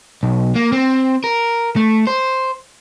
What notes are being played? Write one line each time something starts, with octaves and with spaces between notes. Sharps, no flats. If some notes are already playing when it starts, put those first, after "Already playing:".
B1
A#3
C4
A#4
A3
C5